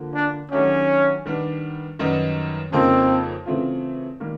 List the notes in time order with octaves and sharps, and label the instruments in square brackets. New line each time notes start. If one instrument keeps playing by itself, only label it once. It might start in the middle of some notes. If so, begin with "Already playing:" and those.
Already playing: [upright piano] D3 F3 A#3
[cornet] D4
[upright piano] D#3 F#3 A3 D4 G4 [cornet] C#4
[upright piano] D#3 G3 B3 D4
F#2 D#3 G3 B3 D#4
[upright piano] F2 C#3 F3 A#3 D#4 [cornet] C4
[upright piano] C#3 E3 A3 C4 F4
D#3 G3 A#3